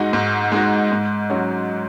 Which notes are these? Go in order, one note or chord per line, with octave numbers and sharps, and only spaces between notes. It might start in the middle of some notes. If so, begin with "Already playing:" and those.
Already playing: G#2 G#3 D#4 F#4
G#2
G#3 D#4 F#4
G#2
F#3 C#4 F#4